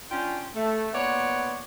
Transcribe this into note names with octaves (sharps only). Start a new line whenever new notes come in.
C#4 D4 F4 G5
A3
A#2 B3 C#5 D5 F#5